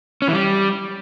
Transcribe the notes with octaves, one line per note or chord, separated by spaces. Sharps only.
C#4
E3
G3